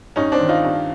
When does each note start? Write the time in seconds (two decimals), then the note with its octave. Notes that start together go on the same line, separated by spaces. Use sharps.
0.16 G2 C#4 D#4
0.32 C4 D4
0.40 D#3
0.49 D#4 F4
0.65 G2